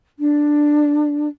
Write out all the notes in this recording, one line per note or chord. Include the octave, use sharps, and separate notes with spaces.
D4